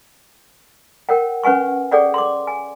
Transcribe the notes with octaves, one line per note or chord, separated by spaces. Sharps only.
A#4 C#5 F#5 G5
C#4 B4 F#5 G#5 C#6
G#4 A4 C#5 D5 F#5 G5
C6 D6
G#5